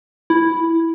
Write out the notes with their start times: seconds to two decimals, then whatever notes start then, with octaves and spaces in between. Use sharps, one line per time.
0.30 E4